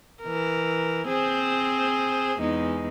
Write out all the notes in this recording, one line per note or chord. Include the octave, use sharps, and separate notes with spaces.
E3 A#4
C4 G#4 C5
E2 G#3 D#4